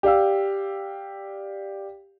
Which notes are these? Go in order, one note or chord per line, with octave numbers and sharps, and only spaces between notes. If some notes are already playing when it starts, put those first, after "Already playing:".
G4 D5 F5 E6